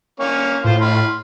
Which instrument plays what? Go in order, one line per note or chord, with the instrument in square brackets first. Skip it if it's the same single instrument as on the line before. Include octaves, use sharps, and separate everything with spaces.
[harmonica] A#3 C#4 C#5
[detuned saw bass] A2 [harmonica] F4 C5
[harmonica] B5 C6 F6